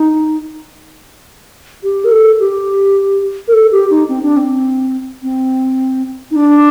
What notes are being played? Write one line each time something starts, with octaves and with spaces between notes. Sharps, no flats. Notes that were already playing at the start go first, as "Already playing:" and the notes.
Already playing: D#4
G4
A#4
A4
G4
A#4
A4
G4
D#4
C4
D4
C4
C4
D#4
D4